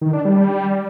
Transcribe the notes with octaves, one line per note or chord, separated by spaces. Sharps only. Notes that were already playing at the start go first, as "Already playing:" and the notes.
D#3
D4
G3